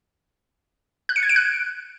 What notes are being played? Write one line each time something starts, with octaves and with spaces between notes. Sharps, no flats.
F#6
C#7
G#6
D7
F#6